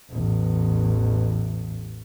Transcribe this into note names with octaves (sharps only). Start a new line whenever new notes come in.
A1 E2